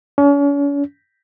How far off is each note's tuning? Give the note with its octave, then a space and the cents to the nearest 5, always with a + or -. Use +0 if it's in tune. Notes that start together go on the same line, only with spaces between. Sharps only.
C#4 +40